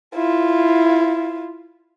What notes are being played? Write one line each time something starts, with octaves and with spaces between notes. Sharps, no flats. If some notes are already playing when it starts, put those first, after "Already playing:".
E4 F4